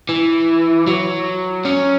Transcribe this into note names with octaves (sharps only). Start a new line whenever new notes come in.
E3
F#3
C#4